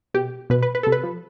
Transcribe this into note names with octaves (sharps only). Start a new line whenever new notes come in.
B2 G4
B2 B4
B4
B4
C3 A4
B4
F3